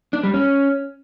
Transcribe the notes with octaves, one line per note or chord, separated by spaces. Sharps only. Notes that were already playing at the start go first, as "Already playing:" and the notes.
D4
G3
C#4